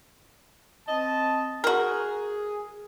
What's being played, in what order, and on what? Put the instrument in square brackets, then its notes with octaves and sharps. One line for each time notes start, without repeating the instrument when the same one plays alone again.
[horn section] C4 D#5 A5
[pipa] F#4 A#4 [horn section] G#4